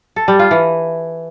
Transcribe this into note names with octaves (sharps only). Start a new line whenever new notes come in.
A4
G3
F4
E3